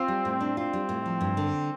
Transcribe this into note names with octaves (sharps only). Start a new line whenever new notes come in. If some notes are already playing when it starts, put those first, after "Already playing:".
Already playing: C4 F4
G3
A2
D4
C4 F4
G3
A2
F3
G2
D3